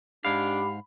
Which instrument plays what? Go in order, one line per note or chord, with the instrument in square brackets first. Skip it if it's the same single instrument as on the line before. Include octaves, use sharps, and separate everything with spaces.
[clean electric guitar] G#2 F5 [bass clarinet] D4 [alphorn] G4 [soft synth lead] B5